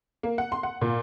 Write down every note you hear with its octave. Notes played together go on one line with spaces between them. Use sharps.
A#3
F#5
C6
F#5
A#2